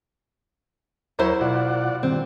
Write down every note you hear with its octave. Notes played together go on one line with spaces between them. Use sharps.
D#2 F#3 E4 A#4 C5 C#5
B2 F4 D5 F#5
G2 C3 D#3 C4